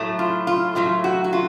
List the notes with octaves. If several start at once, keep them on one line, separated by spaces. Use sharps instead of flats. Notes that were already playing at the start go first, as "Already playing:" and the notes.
Already playing: A2 F#3 A3
F4
F4
A2 F#3 A3 F4
F#4
F#4
F4